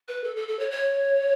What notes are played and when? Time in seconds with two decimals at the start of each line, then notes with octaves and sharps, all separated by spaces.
0.08 B4
0.24 A4
0.36 A4
0.48 A4
0.59 C#5
0.71 C#5